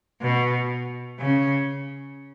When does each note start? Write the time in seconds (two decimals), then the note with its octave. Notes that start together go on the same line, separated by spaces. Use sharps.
0.21 B2
1.20 C#3